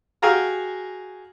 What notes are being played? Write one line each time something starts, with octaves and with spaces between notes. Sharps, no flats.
F#4 G#4 F5 G5 A#5 F6